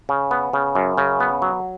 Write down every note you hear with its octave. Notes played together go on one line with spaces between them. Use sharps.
C#3
B3
C#3
F#2
C#3
B3
F#3